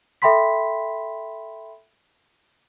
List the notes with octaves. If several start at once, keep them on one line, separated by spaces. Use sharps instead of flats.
A4 E5 G5 B5 C6 B6